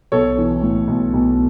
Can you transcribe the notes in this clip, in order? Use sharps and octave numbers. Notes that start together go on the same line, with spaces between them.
B1 A4 C#5
E3
A2
B1
B1